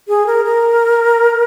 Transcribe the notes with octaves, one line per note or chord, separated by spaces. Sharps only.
G#4
A#4
A#4